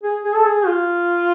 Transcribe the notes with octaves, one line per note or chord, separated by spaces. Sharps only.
G#4
G#4
A4
G#4
F4